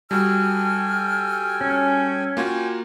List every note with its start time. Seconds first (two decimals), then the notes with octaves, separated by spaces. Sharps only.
0.11 G3 F#4 A4 G5 G#5 F6
1.61 C#4
2.37 A#3 F4 F#4 G5 G#5